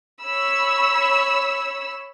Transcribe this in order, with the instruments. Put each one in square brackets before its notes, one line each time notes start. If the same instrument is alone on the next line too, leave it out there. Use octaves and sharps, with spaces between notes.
[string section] C#5 B5 E6